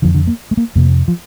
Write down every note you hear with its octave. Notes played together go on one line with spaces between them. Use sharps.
F2 D3 F3
D3
A#3
A3
A#3
F2 C3 A#3
F3